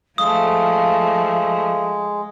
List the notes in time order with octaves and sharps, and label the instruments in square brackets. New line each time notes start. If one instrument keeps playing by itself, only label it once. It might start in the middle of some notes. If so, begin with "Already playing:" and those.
[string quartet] F3 A3 [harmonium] G#3 [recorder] F5 [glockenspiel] D#6